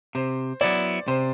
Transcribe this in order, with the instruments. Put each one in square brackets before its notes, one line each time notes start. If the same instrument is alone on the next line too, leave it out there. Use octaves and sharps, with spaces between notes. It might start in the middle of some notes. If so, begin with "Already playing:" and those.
[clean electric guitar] C3 [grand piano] C5
[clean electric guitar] F#3 B3 E4 [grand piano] D5
[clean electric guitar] C3 [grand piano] C5